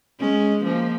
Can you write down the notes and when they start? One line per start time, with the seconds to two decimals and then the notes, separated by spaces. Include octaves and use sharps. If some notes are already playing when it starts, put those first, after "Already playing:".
0.19 G#3 C#4
0.64 F3 A#3